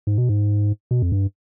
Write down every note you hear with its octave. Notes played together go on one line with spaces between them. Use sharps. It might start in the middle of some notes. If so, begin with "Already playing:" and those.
G#2
B2
G#2
B2
F2
G2